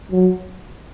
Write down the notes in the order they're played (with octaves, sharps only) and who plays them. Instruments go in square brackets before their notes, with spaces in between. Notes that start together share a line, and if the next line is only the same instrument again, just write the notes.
[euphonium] F#3